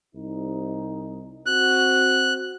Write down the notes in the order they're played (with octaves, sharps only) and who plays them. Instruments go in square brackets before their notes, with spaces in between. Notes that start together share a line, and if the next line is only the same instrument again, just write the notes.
[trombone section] C2 D#4
[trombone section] C4 F#4 [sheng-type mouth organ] F#6